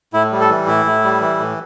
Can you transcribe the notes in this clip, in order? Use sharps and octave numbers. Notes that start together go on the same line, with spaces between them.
A2 E4
G3
A4
E3
A2 E4
A2
G3
E3
A2